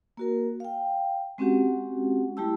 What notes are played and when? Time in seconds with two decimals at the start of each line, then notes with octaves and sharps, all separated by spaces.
0.17 A#3 F#4 A#4
0.60 F5 G5
1.38 G#3 C4 C#4 F#4 G4 F#5
2.37 G3 A3 E4 G4 A5 E6